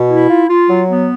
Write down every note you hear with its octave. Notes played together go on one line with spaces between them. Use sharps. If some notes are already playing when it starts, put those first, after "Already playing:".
Already playing: B2
E4
F4
F4
F#3
B3